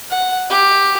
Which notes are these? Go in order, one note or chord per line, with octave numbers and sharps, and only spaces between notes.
F#5
G4